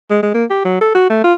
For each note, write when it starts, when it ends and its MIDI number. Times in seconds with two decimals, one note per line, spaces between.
0.10 0.19 56
0.22 0.31 56
0.34 0.45 58
0.50 0.64 67
0.65 0.80 54
0.81 0.92 69
0.95 1.09 66
1.10 1.22 57
1.24 1.34 65